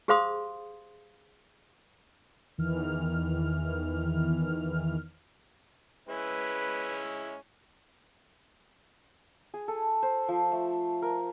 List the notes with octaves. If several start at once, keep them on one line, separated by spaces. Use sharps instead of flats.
G4 G#4 C5 F5 C6 D#6
E2 D#3 E3 F6
G#3 C#4 E4 B4
G#4
A4
C5
F3
A3
A#4